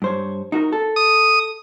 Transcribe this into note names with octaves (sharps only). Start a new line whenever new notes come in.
G2 C5 C#5
D#4 F#4 A#4
A4
D#6